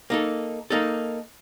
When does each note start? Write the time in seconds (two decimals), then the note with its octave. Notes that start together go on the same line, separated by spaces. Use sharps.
0.10 A#3 D#4 A4
0.70 A#3 D#4 A4